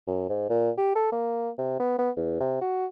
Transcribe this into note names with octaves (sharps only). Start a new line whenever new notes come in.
F#2
G#2
A#2
G4
A4
A#3
C3
B3
B3
E2
C3
F#4